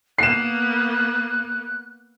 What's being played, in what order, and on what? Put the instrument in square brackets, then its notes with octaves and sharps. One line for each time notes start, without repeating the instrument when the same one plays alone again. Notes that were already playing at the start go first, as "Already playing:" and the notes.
[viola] A#3 B3 [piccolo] F#6 [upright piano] C7 E7